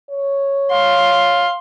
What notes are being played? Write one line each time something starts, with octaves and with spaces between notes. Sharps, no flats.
C#5
F5 C6